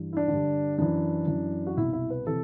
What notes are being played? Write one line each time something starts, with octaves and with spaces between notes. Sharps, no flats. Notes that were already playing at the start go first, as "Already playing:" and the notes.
Already playing: G2 E3
E4
D4
G2 D3
F#2 E3 D4
F#2 E3
F#4
C2 B2 E4
E4
B4
C3 E3 A4